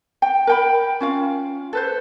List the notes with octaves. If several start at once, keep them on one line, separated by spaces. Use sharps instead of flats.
G5
A#4 G5 B5
C#4 F4 F5
A4 B4 C5